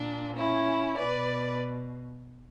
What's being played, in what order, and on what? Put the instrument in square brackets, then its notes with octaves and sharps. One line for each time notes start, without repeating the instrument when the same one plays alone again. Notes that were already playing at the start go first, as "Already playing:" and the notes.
Already playing: [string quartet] A#2 D4
C#4 E4
B2 B4 D5